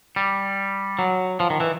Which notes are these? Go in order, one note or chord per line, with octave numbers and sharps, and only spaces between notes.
G3
F#3
F3
D#3
E3